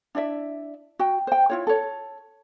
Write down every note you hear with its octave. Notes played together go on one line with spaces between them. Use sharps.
D4 E4 D5 E5
F#4 G5
C5 G5
E4 F4 C#5
A4 C#5